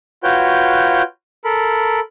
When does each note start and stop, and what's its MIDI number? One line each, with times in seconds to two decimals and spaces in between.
0.23 1.02 65
0.23 1.02 66
0.23 1.02 71
0.23 1.02 73
0.23 1.02 79
0.23 1.02 91
1.45 2.00 69
1.45 2.00 70
1.45 2.00 83